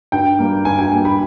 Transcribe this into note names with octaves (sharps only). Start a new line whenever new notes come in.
G2 G5
G3 A#3
G2 G#5
G#5
G3 A#3 G#5
B5